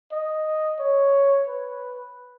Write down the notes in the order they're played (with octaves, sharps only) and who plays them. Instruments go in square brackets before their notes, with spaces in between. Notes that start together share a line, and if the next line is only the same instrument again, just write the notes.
[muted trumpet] D#5
C#5
B4